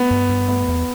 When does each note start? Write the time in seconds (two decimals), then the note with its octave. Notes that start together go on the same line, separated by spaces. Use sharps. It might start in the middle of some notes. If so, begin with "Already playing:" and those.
Already playing: A3 B3
0.10 G2
0.29 G2
0.48 A3 B3
0.68 E2